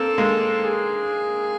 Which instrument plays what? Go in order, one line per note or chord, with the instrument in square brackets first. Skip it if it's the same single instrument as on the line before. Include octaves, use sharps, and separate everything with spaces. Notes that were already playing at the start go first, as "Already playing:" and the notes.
Already playing: [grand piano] A#3 C4 [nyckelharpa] A4
[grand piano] G#3 A#3
[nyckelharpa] G#4